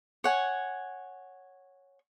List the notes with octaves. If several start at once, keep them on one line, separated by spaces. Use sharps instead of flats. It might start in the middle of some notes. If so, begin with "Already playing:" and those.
C#5 F#5 G#5